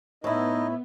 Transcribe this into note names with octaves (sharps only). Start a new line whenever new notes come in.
A2 B3 D#4 E4 D#5